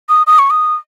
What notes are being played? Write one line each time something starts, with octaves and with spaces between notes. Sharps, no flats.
D#6
D#6
C#6
D#6